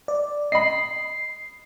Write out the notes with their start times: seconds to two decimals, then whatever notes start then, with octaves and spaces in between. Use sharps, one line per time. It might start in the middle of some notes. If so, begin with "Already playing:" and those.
0.08 D5
0.52 D#5 B5 C7